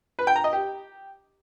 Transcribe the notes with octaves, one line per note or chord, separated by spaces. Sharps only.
B4
G5
A#5
D#5
G4